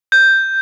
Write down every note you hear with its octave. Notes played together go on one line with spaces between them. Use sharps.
G6